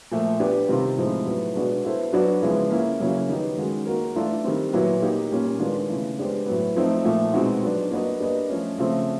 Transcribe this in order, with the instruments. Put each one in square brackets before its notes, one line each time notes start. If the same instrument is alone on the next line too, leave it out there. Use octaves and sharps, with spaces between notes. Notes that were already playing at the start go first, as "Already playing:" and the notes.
[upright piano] A#2 F3 A3
B3 D4 G4
C3 D#3 G3 C4 F4
A2 F3 G#3 C4 D#4
A2 F#3 B3
B2 G#3 B3 D4 F#4
B3 E4 A4 C5
F#3 B3 D4 F#4 B4
C#3 F3 G#3 B3 E4
A#3 C#4 E4
C#3 F#3 A#3 C#4 E4
D#3 G3 B3 D#4 G4
D#3 G#3 C#4 F#4
A#3 D#4 F#4 A#4
E3 A3 D4 F4 A4
D#3 G3 C4
A#2 F#3 B3 E4
A#3 D#4 G4
A#2 G3 A#3 C#4
D#3 G#3 B3 D4 F4
C#3 E3 A3
G#3 B3 D4 G4 C5
A2 F#3 B3
F3 A3 C4 D#4
A#2 F3 A3
B2 G#3 C4 D#4 F#4
F#3 B3 D4
A#3 D4 F#4 B4 D#5
A#3 D4 G4 B4 D#5
F3 A3 C#4
C#3 F3 A3 C4